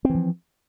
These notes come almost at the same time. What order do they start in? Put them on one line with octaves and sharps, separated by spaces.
C4 E3 F3